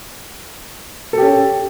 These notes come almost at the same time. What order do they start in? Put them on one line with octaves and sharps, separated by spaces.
A4 G4 C#4